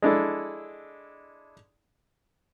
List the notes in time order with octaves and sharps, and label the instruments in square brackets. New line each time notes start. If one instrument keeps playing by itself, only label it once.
[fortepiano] G#3 D4 E4 A4